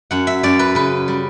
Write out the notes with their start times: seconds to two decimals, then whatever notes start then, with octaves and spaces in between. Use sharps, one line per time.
0.11 F#2 F#5
0.27 E5
0.43 F#2 D5
0.59 B4
0.75 C#3 B4
1.08 G3